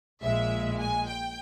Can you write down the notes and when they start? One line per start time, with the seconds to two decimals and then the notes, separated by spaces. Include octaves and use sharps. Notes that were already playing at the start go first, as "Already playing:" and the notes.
0.22 A#1 A#2 G#3 E5
0.79 G#5
1.08 G5